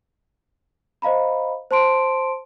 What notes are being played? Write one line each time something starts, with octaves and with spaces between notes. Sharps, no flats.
C5 D#5 F5 A#5 B5
C5 A5 C6 D7